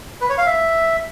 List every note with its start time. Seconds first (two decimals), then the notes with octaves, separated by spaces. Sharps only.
0.21 B4
0.29 C#5
0.38 F5
0.46 E5